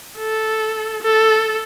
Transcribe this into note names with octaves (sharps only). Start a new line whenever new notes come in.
A4
A4